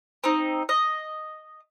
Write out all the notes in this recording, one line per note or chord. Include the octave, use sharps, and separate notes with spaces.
C4 D#4
D#5